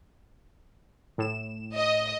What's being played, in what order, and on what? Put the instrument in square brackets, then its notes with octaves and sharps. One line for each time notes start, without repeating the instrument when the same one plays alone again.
[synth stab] A2 E7
[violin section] D#5